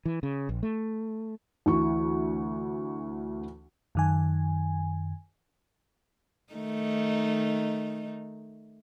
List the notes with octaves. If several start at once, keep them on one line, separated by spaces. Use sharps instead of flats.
E3
C#3
A#1
A3
D2 E3 C#6
F#2 D#3 G#5
D#3 A3 D#4